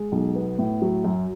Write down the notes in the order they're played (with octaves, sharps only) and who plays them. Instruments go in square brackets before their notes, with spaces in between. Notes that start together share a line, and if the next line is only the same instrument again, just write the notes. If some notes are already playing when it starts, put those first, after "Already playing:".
Already playing: [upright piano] G#3
B1
B3
A2
F#3
F#2